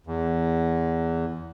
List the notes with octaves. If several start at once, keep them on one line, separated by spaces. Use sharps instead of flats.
E2